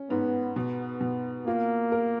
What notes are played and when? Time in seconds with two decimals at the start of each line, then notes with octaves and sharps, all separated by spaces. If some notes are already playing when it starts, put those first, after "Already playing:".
Already playing: C#4
0.10 G#2 B3
0.56 B2 B3
1.01 B2
1.47 A#3 F4
1.92 A#4